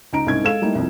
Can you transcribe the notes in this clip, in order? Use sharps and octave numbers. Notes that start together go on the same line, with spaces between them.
C#2 D#4 A#5 D7
C2 G#2 C#4 D#4 G#6
G#3 A4 F5 E7
G3 A3 A#3 D#4 E4
C2 F2